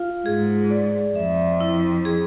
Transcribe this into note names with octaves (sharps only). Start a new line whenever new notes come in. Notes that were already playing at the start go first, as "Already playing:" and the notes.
Already playing: F4 F5
G#2 G#4
D5
F2 E5
E4
G#4